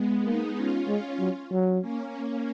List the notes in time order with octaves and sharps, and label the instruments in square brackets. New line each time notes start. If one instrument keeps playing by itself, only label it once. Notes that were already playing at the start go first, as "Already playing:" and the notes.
Already playing: [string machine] G#3 B3
[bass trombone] A#3 [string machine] B3 D#4
[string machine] C#4 F4
[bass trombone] G#3 [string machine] C#4 F4
[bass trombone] F#3
F#3
[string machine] A#3 C#4